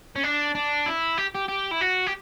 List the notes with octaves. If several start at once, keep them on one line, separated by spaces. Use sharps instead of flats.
C#4
D4
D4
E4
G4
G4
G4
E4
F#4
G4